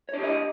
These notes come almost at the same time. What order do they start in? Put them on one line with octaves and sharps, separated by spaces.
C#5 D4 G4 D#5